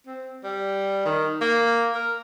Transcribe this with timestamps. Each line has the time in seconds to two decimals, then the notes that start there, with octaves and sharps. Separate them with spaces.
0.07 C4
0.44 G3
1.06 D#3
1.41 A#3
1.95 A#4